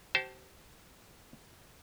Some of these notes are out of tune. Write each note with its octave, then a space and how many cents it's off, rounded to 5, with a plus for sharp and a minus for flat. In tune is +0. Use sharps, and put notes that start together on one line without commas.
G4 -45 C5 +0 A5 +0